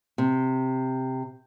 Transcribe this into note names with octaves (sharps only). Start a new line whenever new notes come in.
C3